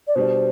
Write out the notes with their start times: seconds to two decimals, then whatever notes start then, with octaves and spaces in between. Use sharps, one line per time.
0.08 D5
0.15 B2 G3 D4 C5